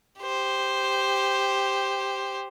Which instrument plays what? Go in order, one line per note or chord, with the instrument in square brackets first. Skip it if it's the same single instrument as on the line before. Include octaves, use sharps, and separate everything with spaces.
[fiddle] G4 C5